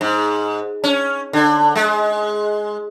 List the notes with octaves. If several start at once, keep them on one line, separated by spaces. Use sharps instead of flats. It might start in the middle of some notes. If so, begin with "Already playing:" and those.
G#2
C#4
D3
G#3